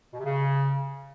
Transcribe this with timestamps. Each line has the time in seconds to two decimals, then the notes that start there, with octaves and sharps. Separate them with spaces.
0.13 B2
0.19 C3
0.24 C#3